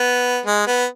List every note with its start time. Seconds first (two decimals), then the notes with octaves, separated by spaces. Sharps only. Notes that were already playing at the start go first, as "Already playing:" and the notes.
Already playing: B3
0.46 G#3
0.67 B3